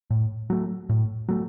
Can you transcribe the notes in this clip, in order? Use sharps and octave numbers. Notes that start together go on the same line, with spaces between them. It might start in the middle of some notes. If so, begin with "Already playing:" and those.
A2
F#3 A3
A2
F#3 A3